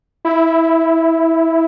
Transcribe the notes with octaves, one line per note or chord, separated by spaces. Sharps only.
E4